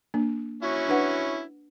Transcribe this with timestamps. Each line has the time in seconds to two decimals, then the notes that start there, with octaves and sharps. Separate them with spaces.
0.14 A#3 D4
0.63 C#4 E4 F#4
0.88 D4 B4 F#5